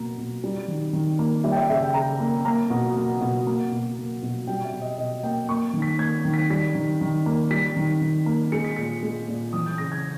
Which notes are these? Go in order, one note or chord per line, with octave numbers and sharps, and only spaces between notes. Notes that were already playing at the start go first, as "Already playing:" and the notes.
Already playing: B2 A#3 A#5
B2
G3
D#3
D#3
A#3
G3 E5
G5
E5
C#3 E5
G5
C#3 A#5
A#3
A#3 A#5
B2
A#3
B2
A#3
B2
A#3
B2
G3 G5
E5
B2
D#5
B2 D#5
A#3 G5
A#3 C#6
D#3
B6
A#3 G#6
D#3
B6
G3 B6
D#3
D#3
A#3
G3 B6
D#3
D#3
A#3
G#3 C#7
B6
A#2 C#7
G#3
A#2
E3 D#6
G6
C#3 A#6
G#6